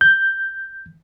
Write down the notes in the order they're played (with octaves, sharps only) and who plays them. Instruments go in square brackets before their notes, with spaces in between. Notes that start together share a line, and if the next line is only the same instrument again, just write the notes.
[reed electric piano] G6